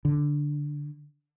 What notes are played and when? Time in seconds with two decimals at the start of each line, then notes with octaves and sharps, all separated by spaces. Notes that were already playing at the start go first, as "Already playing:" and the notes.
0.05 D3